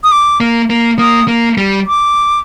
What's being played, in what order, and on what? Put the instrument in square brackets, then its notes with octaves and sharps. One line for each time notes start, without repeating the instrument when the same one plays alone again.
[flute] D#6
D6
[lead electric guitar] A#3
A#3
[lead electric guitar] A#3 [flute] D#6
[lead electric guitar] A#3
G3
[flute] D6